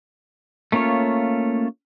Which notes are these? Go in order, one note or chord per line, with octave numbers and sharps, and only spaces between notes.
A3 A#3 C#4 F4 C#5